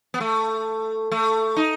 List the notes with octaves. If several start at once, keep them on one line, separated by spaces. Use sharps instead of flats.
B3
A3
A3
D#4